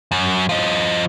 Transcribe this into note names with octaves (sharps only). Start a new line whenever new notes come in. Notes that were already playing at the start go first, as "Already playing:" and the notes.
F#2
F3 D#5